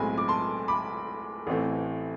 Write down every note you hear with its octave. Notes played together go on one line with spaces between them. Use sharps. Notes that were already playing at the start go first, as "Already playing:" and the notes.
Already playing: B1 A2 G#3 C4 G#5 B5
D6
A5 C6
B5 D6
A1 A2 E3 A3 C4